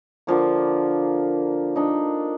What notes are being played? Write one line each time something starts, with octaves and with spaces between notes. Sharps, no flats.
D3 F3 A#3
D4 D#4